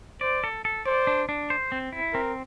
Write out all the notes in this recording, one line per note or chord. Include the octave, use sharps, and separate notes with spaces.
C5 D5
A4
A4
C5 D5
D4
D4
C5
C4
E4
C4 A#4